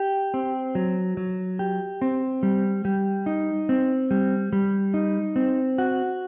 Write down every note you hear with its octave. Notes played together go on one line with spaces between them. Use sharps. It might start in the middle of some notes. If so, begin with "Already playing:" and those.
Already playing: G4
C4
F#3
F#3
G4
C4
G3
G3
D#4
C4
G3
G3
D#4
C4
F#4